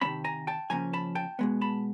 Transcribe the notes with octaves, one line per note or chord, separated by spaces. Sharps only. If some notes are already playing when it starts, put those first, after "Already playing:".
C3 D#3 G#3 C#4 A5 B5
G#5 A#5
G5 A5
C#3 F3 A#3 C#4 G#5 A#5
A5 B5
G5 A5
B2 G#3 B3
A5 B5